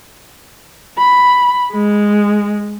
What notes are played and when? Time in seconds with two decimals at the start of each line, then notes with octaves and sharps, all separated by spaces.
0.99 B5
1.72 G#3